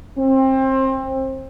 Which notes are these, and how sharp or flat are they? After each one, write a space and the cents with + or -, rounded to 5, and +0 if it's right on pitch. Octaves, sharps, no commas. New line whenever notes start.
C4 +25